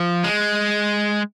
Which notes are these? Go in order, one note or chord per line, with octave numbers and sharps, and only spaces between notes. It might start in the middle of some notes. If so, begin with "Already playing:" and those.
Already playing: F3
G#3